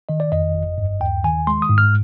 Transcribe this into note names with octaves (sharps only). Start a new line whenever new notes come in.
D#3 D#5
D5
F2 D#5
G1
G2
D#2 G5
D#3 G#5
G#3 C6
D#6
G#2
F6